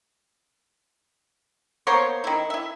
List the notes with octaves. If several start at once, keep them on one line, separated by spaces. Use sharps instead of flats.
A#3 B3 C5 C#5
D#3 E4
E4 E5